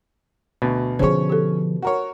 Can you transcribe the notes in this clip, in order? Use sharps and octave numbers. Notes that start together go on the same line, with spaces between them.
D2 B2
D3 F3 C#4 G#4 C5 C#5
G4 A4
F#4 A#4 C#5